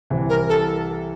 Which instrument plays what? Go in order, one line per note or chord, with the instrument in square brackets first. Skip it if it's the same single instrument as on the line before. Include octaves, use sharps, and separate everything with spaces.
[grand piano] C2 C3 E3
[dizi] A#4
A4